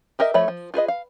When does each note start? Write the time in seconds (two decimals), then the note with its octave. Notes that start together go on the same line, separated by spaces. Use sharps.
0.19 G4 A#4 D#5 E5
0.34 F3 A3 C#5 E5 B5
0.48 F3
0.74 F4 G#4 B4 D#5
0.88 F5